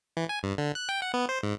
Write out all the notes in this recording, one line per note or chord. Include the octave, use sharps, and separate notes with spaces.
E3
G#5
G2
D3
F#6
G5
F#5
B3
C5
G#2